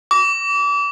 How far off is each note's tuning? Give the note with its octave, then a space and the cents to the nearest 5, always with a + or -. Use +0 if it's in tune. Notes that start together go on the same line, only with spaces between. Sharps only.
D6 -35